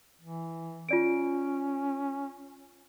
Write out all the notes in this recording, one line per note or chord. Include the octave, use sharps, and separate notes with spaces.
E3
C#4 F4 D5 D7